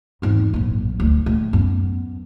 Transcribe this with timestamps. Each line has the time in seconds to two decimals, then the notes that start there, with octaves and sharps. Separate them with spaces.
0.22 G#1 E2
0.53 A#1 F#2
1.00 D2
1.26 A2
1.53 F#2 B3